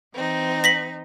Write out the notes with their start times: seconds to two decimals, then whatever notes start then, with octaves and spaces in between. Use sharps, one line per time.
0.15 E3 C4 D#4
0.64 A#6 B6 F#7